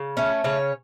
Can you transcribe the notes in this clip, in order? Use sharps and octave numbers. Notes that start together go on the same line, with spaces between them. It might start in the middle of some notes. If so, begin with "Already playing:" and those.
Already playing: C#3
A3 C#4 C#5
C#3 C#4 C#5